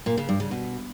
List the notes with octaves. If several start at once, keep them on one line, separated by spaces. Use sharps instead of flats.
A#2
C#3
G2
C#3
B2